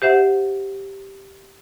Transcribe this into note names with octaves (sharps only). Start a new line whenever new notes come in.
G4 C5 E5 F#5